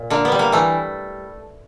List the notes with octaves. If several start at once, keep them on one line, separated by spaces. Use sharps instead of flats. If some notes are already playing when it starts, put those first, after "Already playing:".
Already playing: A#2
D3 A#3
B3
G3
A#3
E3 A3